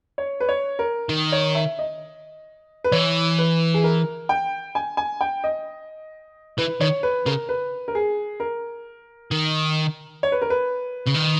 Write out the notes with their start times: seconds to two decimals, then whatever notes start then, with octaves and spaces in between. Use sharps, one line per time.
0.18 C#5
0.40 B4
0.49 C#5
0.79 A#4
1.09 D#3
1.32 C#5
1.55 E5
1.79 D#5
2.84 B4
2.92 E3 C#5
3.38 B4
3.74 G#4
3.84 A#4
4.29 G5
4.75 G#5
4.97 G#5
5.21 G5
5.44 D#5
6.58 E3 B4
6.81 D#3 C#5
7.03 B4
7.26 C#3 A#4
7.49 B4
7.88 A#4
7.95 G#4
8.40 A#4
9.31 D#3
10.23 C#5
10.32 B4
10.42 A#4
10.50 B4
11.07 C#3
11.15 D#3